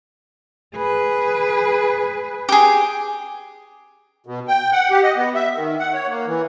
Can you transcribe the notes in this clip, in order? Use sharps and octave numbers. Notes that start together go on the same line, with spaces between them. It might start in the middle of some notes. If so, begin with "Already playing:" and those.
G#4 B4
G4 G#4
B2
G5
F#5
G4
D#5
B3
E5
D#3
F#5
C#5
A#3
E3